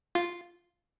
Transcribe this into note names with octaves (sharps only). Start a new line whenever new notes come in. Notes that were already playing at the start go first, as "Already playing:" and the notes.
F4